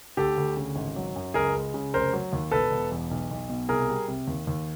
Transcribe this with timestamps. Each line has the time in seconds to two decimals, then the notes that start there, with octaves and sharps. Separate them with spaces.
0.17 D2 G4 A4
0.37 D2
0.57 C#3
0.76 G#1
0.96 F#3
1.16 F#2
1.34 C#2 G#4 A#4
1.55 G#3
1.74 C#3
1.94 F1 A#4 C5
2.13 F#3
2.33 D#2
2.51 E1 A4 B4
2.72 E1
2.92 E2
3.11 B1
3.31 B1
3.49 B2
3.69 C2 G#4 A#4
3.88 G3
4.08 C3
4.28 D#2
4.47 D#2